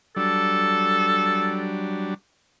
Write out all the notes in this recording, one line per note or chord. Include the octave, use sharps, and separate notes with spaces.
F#3 G3 D4 A4